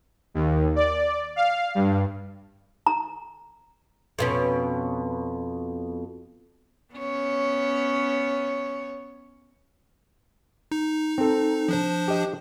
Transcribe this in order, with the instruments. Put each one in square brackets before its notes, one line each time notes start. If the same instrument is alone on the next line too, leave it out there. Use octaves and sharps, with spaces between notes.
[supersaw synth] D#2
D5
F5
G2
[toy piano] A#5
[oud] F2 B2 C#4
[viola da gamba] B3 C#4 C#5
[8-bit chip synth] D#4
[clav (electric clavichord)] C4 A4
[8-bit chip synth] F3 D4 C5
[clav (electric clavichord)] G4 D#5